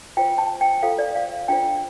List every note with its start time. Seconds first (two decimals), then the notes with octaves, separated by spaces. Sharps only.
0.17 F4 C5 G5
0.38 A5
0.61 G5
0.83 F4 A4 C5 F5
0.99 D5
1.16 F5
1.48 D4 F4 C5 G5